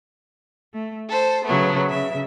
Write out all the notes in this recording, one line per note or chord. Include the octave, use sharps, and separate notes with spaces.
A3
A4 C5
C#3 F#3 A3 B3
C#3 E5